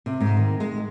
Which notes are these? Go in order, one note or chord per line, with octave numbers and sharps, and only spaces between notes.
C3
G#2
D#3
G#3